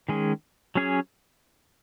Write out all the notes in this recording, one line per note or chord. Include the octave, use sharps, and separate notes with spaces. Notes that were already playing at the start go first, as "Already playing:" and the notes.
D#3 G#3 C#4 G#4
F#3 C#4 G#4 C#5